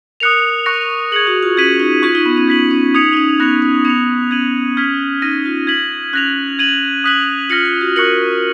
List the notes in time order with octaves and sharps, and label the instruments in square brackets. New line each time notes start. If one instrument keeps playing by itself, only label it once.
[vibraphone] A#4 [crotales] D#6 F#6 C#7 F7
[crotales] C#6 F#6 A#6 C#7
[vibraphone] G#4 [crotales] G#6 C#7 F#7
[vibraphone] F#4
F4
[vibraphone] C#4 [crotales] G#6 B6 D#7 F#7
[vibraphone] D#4
[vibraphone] F4 [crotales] C#6 G#6 D#7
[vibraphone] D#4
B3
C#4
[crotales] G#6 B6 F#7
[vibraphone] C#4
[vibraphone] D#4 [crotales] D#6 G#6 C#7 F7
[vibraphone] D#4
C#4
[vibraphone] B3 [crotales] F#6 A#6 C#7 F7
[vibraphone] C#4
[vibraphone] B3 [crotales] G#6 C#7 F7
[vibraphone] C#4 [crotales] G#6 D#7 F#7
[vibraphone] C#4 [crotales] F6 G#6 B6
[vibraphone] D#4 [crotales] F6 A#6 D#7
[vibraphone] F4
[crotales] G#6 B6 F#7
[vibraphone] C#4 [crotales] F#6 A#6 F7
[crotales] G#6 D#7 F#7
D#6 F#6 B6 F#7
[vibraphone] F4 [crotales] F6 A#6 C#7 F#7
[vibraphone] F4
F#4
[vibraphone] A#4 [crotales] C#6 F#6 C#7 F#7